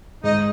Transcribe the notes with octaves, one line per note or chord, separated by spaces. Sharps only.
G#2 D#4 D#5